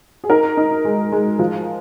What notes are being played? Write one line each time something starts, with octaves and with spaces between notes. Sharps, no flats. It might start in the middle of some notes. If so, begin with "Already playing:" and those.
G#4
D#4 A#4
D#4
G#3
G#3
F3